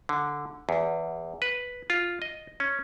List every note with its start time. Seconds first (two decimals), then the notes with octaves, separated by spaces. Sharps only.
0.09 D3
0.69 E2
1.42 B4
1.90 F4
2.22 D#5
2.60 C#4